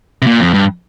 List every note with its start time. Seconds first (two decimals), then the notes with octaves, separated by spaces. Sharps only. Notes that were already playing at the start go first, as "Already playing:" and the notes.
0.22 C3
0.27 A#2
0.40 F2
0.54 G2